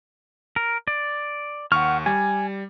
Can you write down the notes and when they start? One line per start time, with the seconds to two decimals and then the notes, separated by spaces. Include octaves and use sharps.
0.56 A#4
0.88 D5
1.72 D#2 F#5 C#6 F6
2.06 G3 G#5